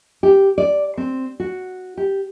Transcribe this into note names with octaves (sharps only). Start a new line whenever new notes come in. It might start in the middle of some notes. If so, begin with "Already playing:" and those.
G4
D5
C4
F#4
G4